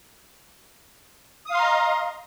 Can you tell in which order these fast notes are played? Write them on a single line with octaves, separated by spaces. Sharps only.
D#6 F5 C6 A#5 D#5